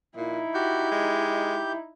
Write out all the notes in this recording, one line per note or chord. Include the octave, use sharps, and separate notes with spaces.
A#2 D#4 E4
F#4 G4 G6
G#3